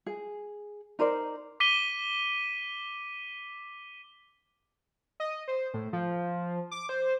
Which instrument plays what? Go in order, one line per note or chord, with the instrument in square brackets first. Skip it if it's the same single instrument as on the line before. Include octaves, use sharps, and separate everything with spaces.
[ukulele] G#4
D#4 A#4 C5 D5
[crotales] D6 B6 D#7 G7
[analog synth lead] D#5
C5
A2
F3
D6
C5